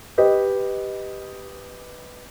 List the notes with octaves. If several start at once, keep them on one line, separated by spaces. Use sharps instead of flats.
G4 B4 D#5